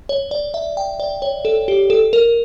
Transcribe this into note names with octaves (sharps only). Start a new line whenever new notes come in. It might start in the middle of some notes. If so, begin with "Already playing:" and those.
C#5
D5
E5
G5
D5
C#5
A4
G4
A4
A#4